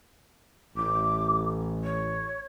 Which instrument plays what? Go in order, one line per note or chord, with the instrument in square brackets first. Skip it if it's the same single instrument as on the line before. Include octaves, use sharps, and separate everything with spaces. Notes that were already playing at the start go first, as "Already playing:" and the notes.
[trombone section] A1 [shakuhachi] D6
[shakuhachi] C#5